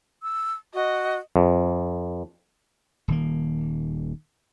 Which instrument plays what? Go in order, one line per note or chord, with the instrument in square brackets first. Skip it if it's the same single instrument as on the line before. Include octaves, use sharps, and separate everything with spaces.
[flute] E6
[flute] F#4 [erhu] D#5
[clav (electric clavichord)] F2
[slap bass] D#1 D#3 A#3